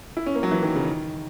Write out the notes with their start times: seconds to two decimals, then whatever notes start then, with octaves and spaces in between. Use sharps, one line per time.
0.17 E4
0.26 C#4
0.35 A#3
0.43 F#3
0.51 E3
0.63 D#3
0.76 C#3
0.86 D#3